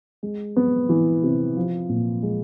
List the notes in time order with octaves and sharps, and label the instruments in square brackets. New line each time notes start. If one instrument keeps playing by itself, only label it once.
[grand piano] G#3
B3
E3
C3
F3
A#2
G#3